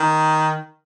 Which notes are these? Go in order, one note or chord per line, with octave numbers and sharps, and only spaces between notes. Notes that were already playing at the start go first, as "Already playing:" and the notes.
Already playing: D#3